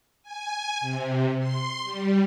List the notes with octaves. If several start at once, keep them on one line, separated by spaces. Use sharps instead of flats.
G#5
C3
C6
G3